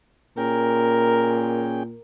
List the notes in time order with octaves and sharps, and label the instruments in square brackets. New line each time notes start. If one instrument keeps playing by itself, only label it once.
[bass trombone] A#2 [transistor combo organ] C#4 G#4 G5 [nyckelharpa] A#4